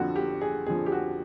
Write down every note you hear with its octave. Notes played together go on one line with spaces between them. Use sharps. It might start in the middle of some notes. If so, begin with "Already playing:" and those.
Already playing: F2 D3 F3 F#4
G4
G#4
F2 D3 F3 G#4
G4
F#4